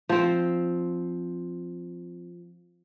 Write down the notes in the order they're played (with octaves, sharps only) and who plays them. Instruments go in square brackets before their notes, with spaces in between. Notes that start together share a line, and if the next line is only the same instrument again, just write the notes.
[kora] F3 C4